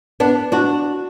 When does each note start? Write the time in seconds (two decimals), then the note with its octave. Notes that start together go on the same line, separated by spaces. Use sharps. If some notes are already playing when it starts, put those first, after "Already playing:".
0.20 B3 D4
0.52 D4 F#4